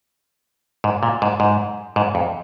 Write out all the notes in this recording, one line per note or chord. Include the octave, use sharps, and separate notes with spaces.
G#2
A#2
G#2
G#2
G#2
F2